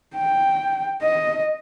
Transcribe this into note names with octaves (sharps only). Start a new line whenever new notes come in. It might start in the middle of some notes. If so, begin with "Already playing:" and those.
G5
D#5